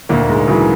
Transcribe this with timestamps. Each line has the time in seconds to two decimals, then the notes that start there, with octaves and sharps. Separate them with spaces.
0.09 D2 A#2 A#3
0.28 G#2 G#3
0.47 C#3 E3 F#3